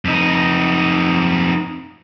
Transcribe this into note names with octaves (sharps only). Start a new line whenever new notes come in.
F2 D#4